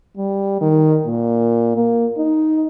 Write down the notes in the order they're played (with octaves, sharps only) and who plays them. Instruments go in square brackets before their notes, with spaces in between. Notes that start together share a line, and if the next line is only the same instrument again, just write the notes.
[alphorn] G3
D#3
A#2
A#3
D#4